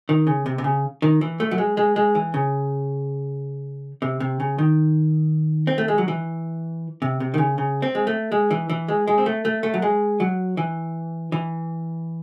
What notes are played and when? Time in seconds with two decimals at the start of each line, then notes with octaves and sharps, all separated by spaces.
0.09 D#3
0.27 C#3
0.46 C3
0.58 C3
0.64 C#3
1.02 D#3
1.21 E3
1.40 A3
1.51 F#3
1.58 G#3
1.77 G#3
1.96 G#3
2.15 E3
2.34 C#3
4.02 C3
4.20 C3
4.40 C#3
4.58 D#3
5.67 C4
5.78 A3
5.88 G#3
5.98 F#3
6.08 E3
7.02 C3
7.20 C3
7.34 D#3
7.38 C#3
7.58 C#3
7.82 C4
7.95 G#3
8.07 A3
8.32 G#3
8.51 E3
8.70 E3
8.88 G#3
9.08 G#3
9.18 C4
9.26 A3
9.45 A3
9.63 A3
9.74 F#3
9.82 G#3
10.20 F#3
10.57 E3
11.32 E3